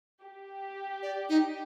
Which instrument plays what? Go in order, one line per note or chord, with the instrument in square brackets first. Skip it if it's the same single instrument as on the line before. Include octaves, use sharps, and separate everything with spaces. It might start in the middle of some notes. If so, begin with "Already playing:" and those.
[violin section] G4
[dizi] D5
D#4